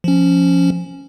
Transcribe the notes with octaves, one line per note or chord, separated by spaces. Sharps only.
F3 C#4